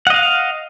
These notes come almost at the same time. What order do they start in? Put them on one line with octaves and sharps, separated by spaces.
F#5 D#5 F5